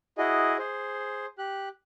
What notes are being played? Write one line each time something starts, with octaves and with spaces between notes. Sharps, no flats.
E4 F#4 G#4 D#5
G#4 C5
G4 F#6